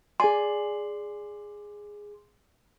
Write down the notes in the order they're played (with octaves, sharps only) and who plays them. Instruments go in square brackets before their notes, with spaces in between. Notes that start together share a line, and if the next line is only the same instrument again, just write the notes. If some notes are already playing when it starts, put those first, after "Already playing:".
[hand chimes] G#4 C6 [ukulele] D5 G#5